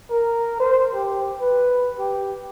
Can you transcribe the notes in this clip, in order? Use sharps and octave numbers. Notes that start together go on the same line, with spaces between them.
A#4
C5
G4
B4
G4